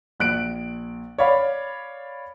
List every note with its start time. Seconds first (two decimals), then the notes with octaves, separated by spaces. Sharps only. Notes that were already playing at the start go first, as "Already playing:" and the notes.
0.20 A#1 F#6 D7
1.18 C#5 D5 F5 B5